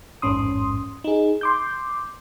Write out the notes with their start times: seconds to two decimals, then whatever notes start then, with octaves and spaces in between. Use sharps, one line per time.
0.22 A1 F2 G#2 C#4 C6 D#6
1.04 D#4 G#4
1.41 C6 D6 G6